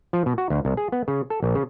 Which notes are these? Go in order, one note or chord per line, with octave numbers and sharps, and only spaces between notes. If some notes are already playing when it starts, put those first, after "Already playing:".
F3
B2
F#4
D2
C2
G#4
B3
C#3
A4
A#1
C#3